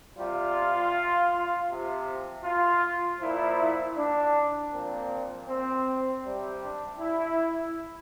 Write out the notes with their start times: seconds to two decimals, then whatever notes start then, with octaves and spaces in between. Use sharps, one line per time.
0.18 C3 G3 F4
1.70 C3 F3
2.44 F4
3.20 A#2 F3 E4
3.97 D4
4.72 A#2 F3 C4
5.48 C4
6.24 C3 G3 C4
6.62 D4
6.99 E4